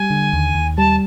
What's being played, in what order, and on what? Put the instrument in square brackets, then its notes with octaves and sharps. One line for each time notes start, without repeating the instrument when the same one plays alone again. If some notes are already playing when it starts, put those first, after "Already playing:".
Already playing: [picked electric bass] G3 [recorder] G#5
[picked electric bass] D3
D#2
D#2
[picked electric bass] G3 [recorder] A5